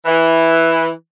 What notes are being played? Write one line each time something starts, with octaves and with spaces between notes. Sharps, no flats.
E3